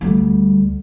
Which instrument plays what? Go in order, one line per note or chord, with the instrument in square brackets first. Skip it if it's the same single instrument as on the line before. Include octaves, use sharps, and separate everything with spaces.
[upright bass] D2 G3